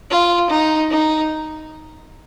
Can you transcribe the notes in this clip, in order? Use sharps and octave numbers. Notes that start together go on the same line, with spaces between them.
F4
D#4
D#4